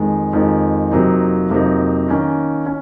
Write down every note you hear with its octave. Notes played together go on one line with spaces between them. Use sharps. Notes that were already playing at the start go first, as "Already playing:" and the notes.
Already playing: F2 D#3 G#3
F2 D#3 G#3
F2 C3 F#3 A#3 D#4
F2 C3 F#3 A#3 D#4
D#3 A#3 C#4
C#4